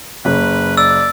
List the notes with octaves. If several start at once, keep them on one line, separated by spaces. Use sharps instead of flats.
F#1 B4
D5 E6